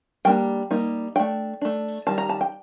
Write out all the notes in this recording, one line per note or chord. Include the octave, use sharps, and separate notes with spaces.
G3 A#3 D4 G5
G3 A#3 D#4
A3 D4 G5
A3 D4
D#3 G3 A5
A#5
A5
G5